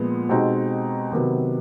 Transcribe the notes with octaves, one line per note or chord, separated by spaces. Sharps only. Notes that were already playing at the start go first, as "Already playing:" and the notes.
Already playing: A#2 F3 G#3 B3
B2 G#3 C4 D#4 G4
C3 D#3 F#3 B3